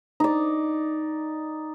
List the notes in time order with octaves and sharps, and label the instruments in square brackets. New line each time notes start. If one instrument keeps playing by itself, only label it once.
[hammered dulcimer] D#4 D5